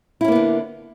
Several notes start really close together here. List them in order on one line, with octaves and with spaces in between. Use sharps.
E4 C#4 A#3 B3 D3